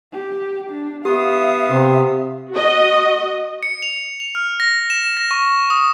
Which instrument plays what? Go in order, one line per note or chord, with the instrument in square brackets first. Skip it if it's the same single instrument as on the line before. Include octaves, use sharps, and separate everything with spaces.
[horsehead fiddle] G4
D4
[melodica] B3 D#6 [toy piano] G4 [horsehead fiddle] E5 F5
[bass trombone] C3 [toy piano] G4
[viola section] F#4 D#5
[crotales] C#7
F7
F7
F6
A#6
E7
A#6
C#6
D#6